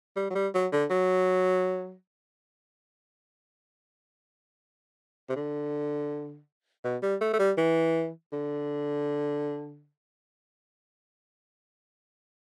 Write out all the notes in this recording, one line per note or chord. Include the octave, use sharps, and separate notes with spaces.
G3
F#3
G3
F#3
D3
F#3
C3
D3
B2
G3
A3
A3
G3
E3
D3